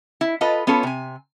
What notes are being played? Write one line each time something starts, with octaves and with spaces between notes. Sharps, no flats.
E4
F4 A4 B4 D#5
B3 C#4 F4 A4 C#5
C3 G#5